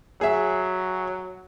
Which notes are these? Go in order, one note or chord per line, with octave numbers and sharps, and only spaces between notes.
F#3 G#4 E5